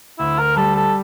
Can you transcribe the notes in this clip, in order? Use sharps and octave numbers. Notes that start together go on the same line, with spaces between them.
D2 E4
A#4
G3 A4
A4